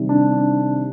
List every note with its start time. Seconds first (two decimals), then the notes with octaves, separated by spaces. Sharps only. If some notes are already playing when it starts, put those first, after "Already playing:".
Already playing: C3 D#3 G3
0.09 D4